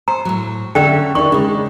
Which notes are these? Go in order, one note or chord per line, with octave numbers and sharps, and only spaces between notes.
C5 A#5
A2 F#3
D3 A3 C#4 E5 G5
D#3 D4 D#4 G4 C#6
C#3 G#3 D4 D#4